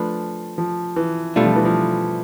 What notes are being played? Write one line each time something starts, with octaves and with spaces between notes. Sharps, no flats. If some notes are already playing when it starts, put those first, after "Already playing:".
Already playing: F3 A3 D4 B4
F3
E3
B2 G3 A3 D4 F4
F3
E3
F3